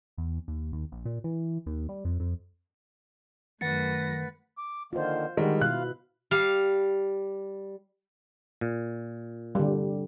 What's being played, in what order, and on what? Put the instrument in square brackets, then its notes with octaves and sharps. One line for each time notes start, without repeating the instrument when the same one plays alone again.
[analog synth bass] E2
D#2
D#2
A#1
A#2
E3
D#2
G3
F2
F2
[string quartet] F#2 A#6 [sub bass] D#3 [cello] A3 B4 [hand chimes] F#5 A6 C#7
[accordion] D6
[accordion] D3 D#3 A#3 [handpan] F4 C5
[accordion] D3 [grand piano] D#3 G3 G#3
[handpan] B2 E4 [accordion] F4 F5 [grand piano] F#6
[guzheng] G3 F5
[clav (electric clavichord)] A#2
[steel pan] D3 G3